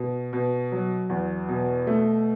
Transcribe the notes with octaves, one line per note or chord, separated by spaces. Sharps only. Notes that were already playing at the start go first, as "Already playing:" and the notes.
Already playing: B2
B2
F#3
E2
B2
A3